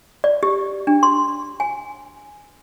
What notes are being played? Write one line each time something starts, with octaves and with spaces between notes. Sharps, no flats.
D5
G4
D4
C6
G#5